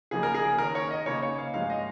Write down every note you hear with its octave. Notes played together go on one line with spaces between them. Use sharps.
C#3 F3 A#3 D#4 G#4
A#4
G#4
D#3 C#4 A#4
C#5
D#5
C#3 A#3 D#4 C#5
C#5
F5
G#2 F3 G#3 D#4 F5
D#5